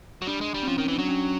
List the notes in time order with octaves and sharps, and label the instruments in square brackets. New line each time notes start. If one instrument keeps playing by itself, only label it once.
[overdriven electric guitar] F#3
[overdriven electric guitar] G3 [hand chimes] D4
[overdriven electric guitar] G#3
G3
[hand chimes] C4
[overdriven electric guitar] F3 [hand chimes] C#4
[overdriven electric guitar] D#3
E3
[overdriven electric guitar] F#3 [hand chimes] D4
[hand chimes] C#4